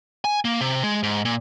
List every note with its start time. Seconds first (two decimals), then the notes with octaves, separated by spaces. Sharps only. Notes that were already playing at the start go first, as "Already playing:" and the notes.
0.25 G#5
0.45 A#3
0.61 C3
0.84 G#3
1.03 G#2
1.25 A#2